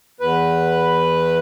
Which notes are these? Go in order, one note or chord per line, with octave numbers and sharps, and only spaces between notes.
E2 B4